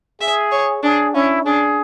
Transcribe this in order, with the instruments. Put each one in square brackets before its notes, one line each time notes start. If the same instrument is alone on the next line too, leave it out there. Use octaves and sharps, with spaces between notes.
[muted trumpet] G#4 [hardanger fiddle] E5
[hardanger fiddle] C#5
[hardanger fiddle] D4 [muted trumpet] G#4
[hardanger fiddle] C#4 [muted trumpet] E4
[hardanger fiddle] D4 [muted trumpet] G#4